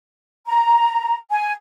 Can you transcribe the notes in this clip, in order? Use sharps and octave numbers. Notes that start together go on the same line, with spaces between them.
A#5
G#5